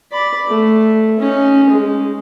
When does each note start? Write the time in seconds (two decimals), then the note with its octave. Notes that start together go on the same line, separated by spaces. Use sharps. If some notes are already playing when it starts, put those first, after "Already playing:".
0.12 D5 B5
0.49 A3
1.19 C#4 D#4
1.70 G#3